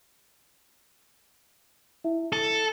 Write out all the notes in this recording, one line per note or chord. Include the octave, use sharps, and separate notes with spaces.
E4 E5
A4